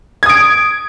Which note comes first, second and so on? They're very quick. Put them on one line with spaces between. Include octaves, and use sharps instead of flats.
G#6 D#6 D7